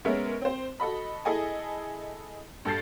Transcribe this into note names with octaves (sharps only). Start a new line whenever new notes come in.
G#3 B3 C#4 A#4 E5
C4 C5
F#4 A4 D#5 B5
E4 G#4 A4 D#5 G#5
G2 A4 A5 G6 A6 C7